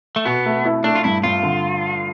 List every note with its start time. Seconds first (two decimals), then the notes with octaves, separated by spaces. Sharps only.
0.16 A3
0.25 B2 B3
0.46 A3
0.65 E4
0.84 A3 D4
0.95 F4
1.04 G2 E4
1.23 G2 F4
1.43 D3